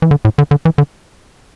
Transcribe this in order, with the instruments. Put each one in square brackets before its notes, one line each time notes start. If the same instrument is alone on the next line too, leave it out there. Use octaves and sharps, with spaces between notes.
[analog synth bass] E3
D3
A2
D3
D3
E3
D3